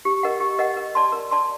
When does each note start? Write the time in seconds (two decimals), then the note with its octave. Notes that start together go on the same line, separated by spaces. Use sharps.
0.05 G4
0.23 A#4 D#5 F#5
0.40 G4
0.59 A#4 D#5 F#5
0.77 A#4
0.95 D5 A5 C6
1.12 A#4
1.31 D5 A5 C6